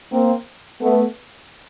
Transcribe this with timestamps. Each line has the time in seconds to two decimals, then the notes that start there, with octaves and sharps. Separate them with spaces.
0.12 A#3 C4
0.81 A3 B3